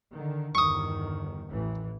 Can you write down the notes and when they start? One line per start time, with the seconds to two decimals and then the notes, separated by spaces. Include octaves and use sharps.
0.11 D3 D#3
0.55 G1 E2 D#3 C#6 D#6
1.48 A1 E3